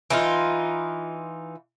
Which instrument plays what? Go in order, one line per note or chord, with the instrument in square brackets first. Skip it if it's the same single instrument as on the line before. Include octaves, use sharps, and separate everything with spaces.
[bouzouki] E3 D#4 F4